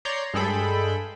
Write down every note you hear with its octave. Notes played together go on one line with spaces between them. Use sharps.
C#5 D5 A#5 C6 G6
G2 G#3 G#4 A4 G5 B5